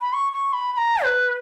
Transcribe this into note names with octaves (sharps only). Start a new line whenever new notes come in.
B5
C#6
C#6
B5
B5
A#5
B4